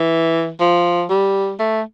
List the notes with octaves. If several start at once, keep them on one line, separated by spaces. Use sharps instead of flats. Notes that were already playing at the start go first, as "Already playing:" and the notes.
Already playing: E3
F3
G3
A3